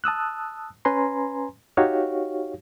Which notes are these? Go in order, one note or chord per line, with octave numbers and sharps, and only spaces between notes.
A5 D#6 E6 F#6
C#4 B4 G#5 A#5 C6
D#4 F#4 G4 C#5 F5